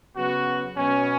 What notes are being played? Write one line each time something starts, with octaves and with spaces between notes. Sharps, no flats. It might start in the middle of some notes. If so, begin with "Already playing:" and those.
C#3 F#3 B3 F#4
B2 F#3 B3 C#4